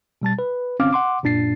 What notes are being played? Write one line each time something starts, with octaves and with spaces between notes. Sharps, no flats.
B2 G3 A5 A6
B4
G1 C4 C#4 F5 D6 F6
F#5 C6 D6
F#2 A#2 D4 A6 C7